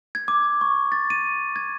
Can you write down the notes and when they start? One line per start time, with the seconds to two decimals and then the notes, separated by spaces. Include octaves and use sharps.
0.15 G#6
0.28 D6
0.61 C#6
0.92 A6
1.10 D#7
1.56 G#6